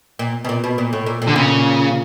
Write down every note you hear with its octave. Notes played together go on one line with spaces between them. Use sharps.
A#2
B2
A#2
B2
A#2
A2
A#2
A#2
D3
A#2 C#3